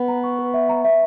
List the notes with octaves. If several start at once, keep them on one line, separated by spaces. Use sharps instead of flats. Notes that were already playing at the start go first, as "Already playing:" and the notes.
Already playing: B3 B4
A#5
C#6
B4
E5
A#5
E5